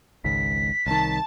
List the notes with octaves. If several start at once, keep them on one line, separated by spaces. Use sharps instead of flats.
G#1 C#2 G#2 B6
C2 D#3 A5